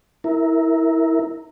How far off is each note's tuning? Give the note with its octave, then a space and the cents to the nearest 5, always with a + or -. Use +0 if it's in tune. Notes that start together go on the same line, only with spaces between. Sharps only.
E4 -15 A#4 +0